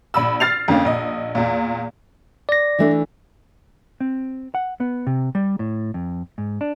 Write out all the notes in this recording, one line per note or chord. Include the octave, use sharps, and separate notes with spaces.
A#1 B5 E6
F6 A6 C7 F7
F2 D3 A#3 C#4
A#1 D#5
E2 A#2
D5 A#6
E3 A3 D4
C4
F#5
B3
C3
G3
A2
F2
G#2
D4